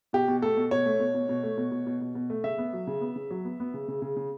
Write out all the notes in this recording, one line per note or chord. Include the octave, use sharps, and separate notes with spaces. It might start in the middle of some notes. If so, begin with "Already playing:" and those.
B2 G4
B2
A3 A4
B2
B2 C#5
A3
B2
B2
B2
A3
B2
B2
B2
B2
B2
A3
C#3 E5
B3
F#3
C#3
B3
C#3
F#3
B3
B3
C#3
C#3
C#3
C#3